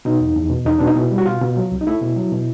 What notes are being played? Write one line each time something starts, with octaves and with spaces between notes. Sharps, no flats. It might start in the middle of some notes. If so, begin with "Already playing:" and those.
B2 D#4
E2
E2
B2
E2 D#4
B2 D4
D#4
B2 E4
G3
F#4
B2 F4
B2
F#3
C2
D#4
A3 E4
B2
F#3
B2